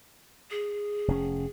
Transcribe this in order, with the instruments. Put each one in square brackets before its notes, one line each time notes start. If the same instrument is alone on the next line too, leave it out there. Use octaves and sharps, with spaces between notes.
[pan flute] G#4
[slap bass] F1 C#4